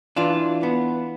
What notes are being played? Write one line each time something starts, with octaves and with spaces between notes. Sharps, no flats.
E3 D4 F4
B3